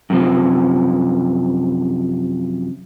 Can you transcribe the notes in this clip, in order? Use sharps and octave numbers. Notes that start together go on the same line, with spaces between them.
F#2 C3 F3